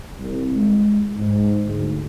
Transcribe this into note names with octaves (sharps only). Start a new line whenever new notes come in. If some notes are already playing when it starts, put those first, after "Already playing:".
C2
G#3
G#2
D2